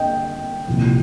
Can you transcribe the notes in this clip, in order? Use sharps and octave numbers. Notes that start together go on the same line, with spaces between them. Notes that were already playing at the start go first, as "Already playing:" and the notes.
Already playing: G2 D#5 G5
C2 A#2 F3